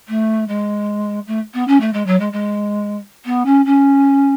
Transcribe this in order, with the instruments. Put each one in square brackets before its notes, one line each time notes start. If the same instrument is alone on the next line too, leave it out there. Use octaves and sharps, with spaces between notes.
[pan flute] A3
G#3
A3
B3
C#4
A3
G#3
F#3
G#3
G#3
B3
C#4
C#4